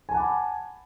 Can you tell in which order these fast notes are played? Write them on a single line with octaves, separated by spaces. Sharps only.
G#5 A5 F#5 D6 B5